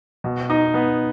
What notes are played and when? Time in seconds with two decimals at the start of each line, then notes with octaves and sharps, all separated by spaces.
0.24 B2
0.50 D#4
0.74 B3